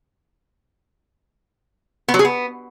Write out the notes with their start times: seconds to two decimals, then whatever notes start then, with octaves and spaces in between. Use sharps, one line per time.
2.08 B3
2.14 F#3
2.19 G#4
2.25 B3